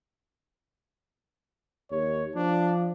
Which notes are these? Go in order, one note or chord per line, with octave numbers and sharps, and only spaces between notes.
D#2 C#5
F3 D4